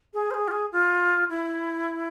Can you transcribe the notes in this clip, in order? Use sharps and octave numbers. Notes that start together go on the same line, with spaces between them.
G#4
C5
G#4
F4
G#4
F4
E4